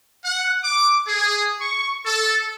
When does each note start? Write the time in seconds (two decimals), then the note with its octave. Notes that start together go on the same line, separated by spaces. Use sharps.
0.25 F#5
0.64 D6
1.08 G#4
1.61 C#6
2.06 A4